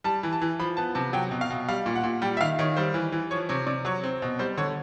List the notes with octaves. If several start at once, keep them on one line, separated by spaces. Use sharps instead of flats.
G3 A5
E3
A5
E3
F3 B5
B3 A5
C3 A5
F#3 G5
B2
F5
B2
G3 F5
A#2
F#5
A#2
G3 G5
E5
D#3 F5
D#3 C#5
G3 C5
E3
E3
F3 C#5
C3 C#5
C3 D5
F#3 C#5
C4
B2
G3 C5
D3 C#5